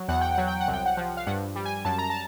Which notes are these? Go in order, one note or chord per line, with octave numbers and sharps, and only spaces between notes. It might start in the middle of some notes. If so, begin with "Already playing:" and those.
Already playing: F#3
E2 F#5
G5
F#3 F#5
G5
F#5
C2
G5
F#5
F3
F5
G2 F#5
G3
G#5
F#2 A5
A#5
A5